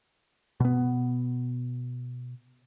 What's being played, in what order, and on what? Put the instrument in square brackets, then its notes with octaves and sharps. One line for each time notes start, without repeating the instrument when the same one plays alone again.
[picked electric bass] B2 B3